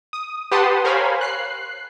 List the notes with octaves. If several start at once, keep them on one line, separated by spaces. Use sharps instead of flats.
D#6
G4 B4 F#5 A5 C6 D#6
A#4 C5 C#5 F5 G#5 B5
F#6 C7